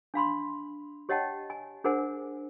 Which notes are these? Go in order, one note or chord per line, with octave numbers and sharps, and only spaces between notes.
D4 F5 B5 C6
G4 C#5 D#5 F#5 G5 A5
G#5
D4 G#4 A#4 C5 F#5 G#5